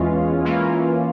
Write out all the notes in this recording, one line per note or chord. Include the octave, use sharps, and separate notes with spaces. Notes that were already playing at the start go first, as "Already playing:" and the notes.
Already playing: E2 E3 G#3 C#4 F4
E3 A#3 C#4 F4